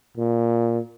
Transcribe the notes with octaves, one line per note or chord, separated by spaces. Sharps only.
A#2